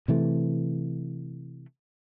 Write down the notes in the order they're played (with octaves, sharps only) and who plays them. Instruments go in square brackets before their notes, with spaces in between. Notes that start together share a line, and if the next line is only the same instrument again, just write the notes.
[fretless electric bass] C3 E3 A3